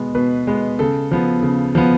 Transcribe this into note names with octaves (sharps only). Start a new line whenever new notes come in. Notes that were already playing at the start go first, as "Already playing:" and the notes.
Already playing: B2 G#3 B3
B2 B4
G#3 B3
C#3 A4
F3 B3
C#3
F3 B3